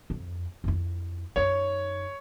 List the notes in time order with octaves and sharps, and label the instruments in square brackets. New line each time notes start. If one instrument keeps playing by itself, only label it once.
[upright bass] F2
F2 E4
[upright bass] F#2 D#4 [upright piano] C#5